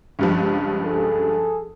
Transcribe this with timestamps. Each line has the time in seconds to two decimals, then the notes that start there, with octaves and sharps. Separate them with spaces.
0.19 C#2 G2 F3
0.85 G#4 A4